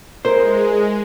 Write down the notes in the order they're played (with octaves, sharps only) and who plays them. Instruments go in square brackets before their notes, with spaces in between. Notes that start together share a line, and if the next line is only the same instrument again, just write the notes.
[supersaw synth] G#3 [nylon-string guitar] E4 A#4 [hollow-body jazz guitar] C5